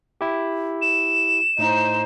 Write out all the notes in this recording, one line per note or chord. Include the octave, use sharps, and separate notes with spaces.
E4 G4
E7
A2 D#4 C5